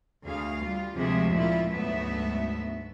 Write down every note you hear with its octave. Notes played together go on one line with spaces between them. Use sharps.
D2 G#4 F5
G3 F4
D2 C3 F3 G#3 G#4 E5
A#2 E4 F4
D2 G#2 F#3 A3 B3 E5